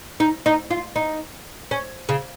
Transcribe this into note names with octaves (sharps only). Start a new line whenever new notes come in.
D#4
D#4
F4
D#4
C#4
C#3